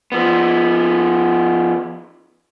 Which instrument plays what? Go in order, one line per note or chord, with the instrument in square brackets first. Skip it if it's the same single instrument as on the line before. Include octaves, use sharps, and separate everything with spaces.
[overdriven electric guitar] F3 B3